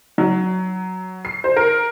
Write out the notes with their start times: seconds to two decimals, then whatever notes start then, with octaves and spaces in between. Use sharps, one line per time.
0.18 F#3
1.25 C7
1.44 C5
1.56 A#4